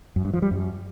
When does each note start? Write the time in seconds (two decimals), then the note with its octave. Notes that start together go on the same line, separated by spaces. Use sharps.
0.16 F#2
0.25 G2
0.34 F3
0.42 G3
0.51 F#2